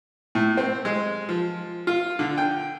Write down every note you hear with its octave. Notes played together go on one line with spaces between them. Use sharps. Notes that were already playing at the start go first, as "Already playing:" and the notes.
A2
C4
G#3
F3
F4
D3
G5